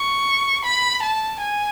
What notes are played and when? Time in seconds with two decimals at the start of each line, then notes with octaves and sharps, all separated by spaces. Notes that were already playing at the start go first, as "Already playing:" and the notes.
Already playing: C#6
0.65 B5
1.03 A5
1.41 G#5